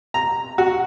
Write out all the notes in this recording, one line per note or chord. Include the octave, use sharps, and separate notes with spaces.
A#5
F#4